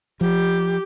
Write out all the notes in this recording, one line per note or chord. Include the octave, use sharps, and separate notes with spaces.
F3 G4